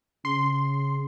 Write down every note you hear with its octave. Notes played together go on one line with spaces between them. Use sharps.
C#3 C6